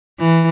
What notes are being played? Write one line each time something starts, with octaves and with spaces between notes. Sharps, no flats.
E3